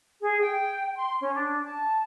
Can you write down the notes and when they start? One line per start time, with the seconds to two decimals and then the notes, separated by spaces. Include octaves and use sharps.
0.21 G#4
0.42 G5
0.95 C6
1.21 C#4
1.34 D4
1.64 A5